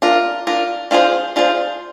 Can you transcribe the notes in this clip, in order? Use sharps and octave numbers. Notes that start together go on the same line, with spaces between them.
D4 F4 A#4
D4 F4 A#4
D4 F4 G#4 C5
D4 F4 G#4 C5